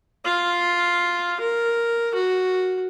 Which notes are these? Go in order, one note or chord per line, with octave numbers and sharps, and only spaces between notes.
F4 F5
A#4
F#4